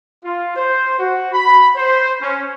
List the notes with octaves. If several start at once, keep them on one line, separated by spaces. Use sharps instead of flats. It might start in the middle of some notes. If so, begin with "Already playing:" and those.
F4
C5
F#4
B5
C5
C#4